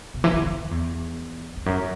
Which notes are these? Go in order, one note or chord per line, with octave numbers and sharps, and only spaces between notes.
B2
E3
D3
F#2
E2
E2
F#2